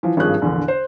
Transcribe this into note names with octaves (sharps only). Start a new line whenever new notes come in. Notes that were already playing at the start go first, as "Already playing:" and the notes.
E3 F3
G#1 G2 F3 G#4 F#6
A#1 E2 D3
C5